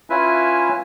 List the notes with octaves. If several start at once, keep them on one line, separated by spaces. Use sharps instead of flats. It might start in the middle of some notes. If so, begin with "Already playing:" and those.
C#4 E4 F4 B4 E5 G#5